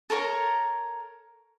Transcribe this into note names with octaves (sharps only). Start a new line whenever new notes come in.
A4 A#4 C#5 A#5